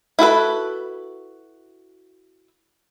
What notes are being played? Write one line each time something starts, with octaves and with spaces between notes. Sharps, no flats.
E4 F#4 A4 B4